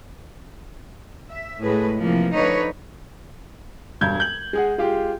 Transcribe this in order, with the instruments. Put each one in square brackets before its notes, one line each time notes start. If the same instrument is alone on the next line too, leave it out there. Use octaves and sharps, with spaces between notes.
[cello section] E5
A2 G#3 G#4 B4
C3 E3 F3 A#3
D3 F3 D#4 B4 C#5
[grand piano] E1 G2 G6 G#6
G6 F#7
G#3 G#4 F#5
G#3 F4 G4